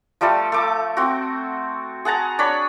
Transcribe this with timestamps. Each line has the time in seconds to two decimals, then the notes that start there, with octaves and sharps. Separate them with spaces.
0.21 F3 G3 A3 A4
0.52 A3 D6
0.97 C4 F#4
2.05 G#4 F#5 A5 A#5
2.39 D4 C#5 B5